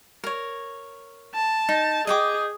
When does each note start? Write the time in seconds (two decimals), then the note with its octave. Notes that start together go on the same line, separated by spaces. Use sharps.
0.24 A#4 C#5
1.35 A5
1.69 D#4
2.07 G#4 D#5 G5 D6